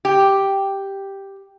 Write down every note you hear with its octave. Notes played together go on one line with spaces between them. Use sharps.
G4